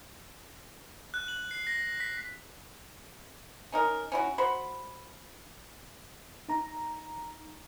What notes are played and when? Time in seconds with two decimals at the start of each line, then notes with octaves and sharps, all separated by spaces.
1.14 F#6
1.28 F#7
1.51 C7
1.67 A#6
2.00 B6
3.72 C#4 D#4 A#4
4.12 C#4 E4 F#4
4.38 F#4 C5 B5
6.49 D#4 A#5